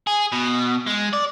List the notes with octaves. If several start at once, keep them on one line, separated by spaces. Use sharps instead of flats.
G#4
B2
G#3
D5